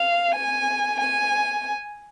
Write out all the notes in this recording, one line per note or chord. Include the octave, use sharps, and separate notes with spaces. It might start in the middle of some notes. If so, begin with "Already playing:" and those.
Already playing: F5
G#5
G#5